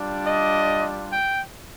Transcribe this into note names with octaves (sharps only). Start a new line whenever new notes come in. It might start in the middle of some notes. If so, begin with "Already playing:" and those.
Already playing: G3 D4 F4
D#5
G5